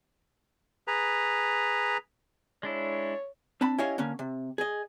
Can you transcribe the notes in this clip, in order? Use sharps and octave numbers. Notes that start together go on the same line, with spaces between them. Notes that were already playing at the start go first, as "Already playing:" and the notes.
G#4 B4 A#5
G#3 D4 E4 C#5
C4 D4 A5 B5
C#4 E4 G4 C#5 D#5 F5
D3 A#3 C#4
C3
G#4 D#5